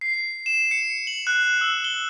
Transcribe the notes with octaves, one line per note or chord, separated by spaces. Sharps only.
C7
E7
C#7
F#7
F#6
E6
G7